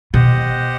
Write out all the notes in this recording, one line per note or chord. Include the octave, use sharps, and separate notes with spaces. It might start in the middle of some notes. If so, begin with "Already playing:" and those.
B2 G4 C5 D#5 F#5